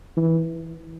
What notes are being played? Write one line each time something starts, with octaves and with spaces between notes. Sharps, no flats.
E3